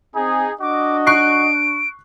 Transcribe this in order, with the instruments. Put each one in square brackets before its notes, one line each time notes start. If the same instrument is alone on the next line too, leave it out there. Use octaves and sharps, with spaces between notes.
[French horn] C4 [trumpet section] D#4 G#4
[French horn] D4 [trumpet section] F#4 D#5 [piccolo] D6
[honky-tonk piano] C#6 F#6 C7 [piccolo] D7